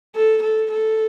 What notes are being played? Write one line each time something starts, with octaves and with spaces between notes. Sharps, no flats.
A4
A4
A4